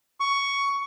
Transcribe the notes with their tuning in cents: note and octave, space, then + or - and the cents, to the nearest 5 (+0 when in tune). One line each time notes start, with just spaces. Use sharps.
C#6 +10